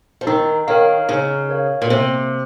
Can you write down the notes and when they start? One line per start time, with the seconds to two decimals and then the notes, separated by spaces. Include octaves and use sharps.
0.21 F3
0.27 D#3 D#4
0.67 D#3 A#4 C#5 F5
1.09 C#3 D#4
1.49 A#4 C#5 F5
1.82 A#2
1.90 C3 A#3